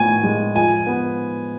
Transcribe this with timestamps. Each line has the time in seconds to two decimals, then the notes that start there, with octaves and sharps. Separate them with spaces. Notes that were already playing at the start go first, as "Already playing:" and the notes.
Already playing: A2 F3 B3 G#5
0.23 G#3
0.56 F3 G#5
0.87 B3